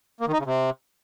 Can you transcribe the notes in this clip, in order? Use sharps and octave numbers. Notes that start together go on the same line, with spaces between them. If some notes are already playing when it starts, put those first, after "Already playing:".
A#3
D#3
D#4
C#3
C3